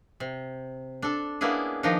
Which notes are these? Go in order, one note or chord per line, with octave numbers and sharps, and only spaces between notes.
C3
D4 A4
A#3 B3 C#4 D4 E4 G#4
D#3 F3 D4 D#4